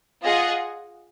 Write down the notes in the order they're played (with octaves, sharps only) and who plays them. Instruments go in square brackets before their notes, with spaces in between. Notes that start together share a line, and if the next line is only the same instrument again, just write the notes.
[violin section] F4 G#4 D#5 F#5